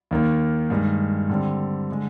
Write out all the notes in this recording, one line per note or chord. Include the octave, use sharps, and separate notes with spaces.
D#2 D#3 A#3
G2 D#3 G#3
D3 G3 C4
D3 G#3